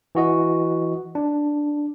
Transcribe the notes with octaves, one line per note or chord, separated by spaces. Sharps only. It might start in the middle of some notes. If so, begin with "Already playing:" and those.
E3 F#4 D#5
D4